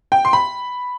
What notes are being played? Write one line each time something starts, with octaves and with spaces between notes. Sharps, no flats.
G5
C6
B5